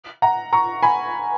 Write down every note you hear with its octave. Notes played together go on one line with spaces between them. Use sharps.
F#5 A#5
A#5 C#6
G#5 B5